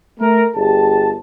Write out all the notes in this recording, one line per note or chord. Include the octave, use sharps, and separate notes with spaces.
A3 A#4
G1 G4 G#4 A5